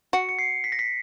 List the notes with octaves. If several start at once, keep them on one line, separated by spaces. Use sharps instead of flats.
F#4 C#7
C#7
C7
B6
A#6
B6